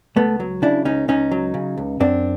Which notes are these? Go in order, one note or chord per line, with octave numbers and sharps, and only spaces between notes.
C#2 A3 B3
F#3
C#3 D4 E4
C#2 C#4 D#4
C#2 C#4 D#4
F#3
C#3
C#2
F#2 C4 D4